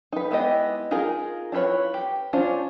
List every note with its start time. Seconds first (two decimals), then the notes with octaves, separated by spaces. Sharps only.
0.12 D#4 B4
0.31 G#3 B3 E4 G4 D#5
0.91 D#4 F4 G#4 A#4
1.52 D4 E4 F4 B4 C#5
1.94 G4
2.33 C#4 D4 F4 C5